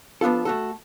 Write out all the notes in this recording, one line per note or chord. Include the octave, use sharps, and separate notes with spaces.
F3 B3 D4 F4 A4
A3 F#4 A4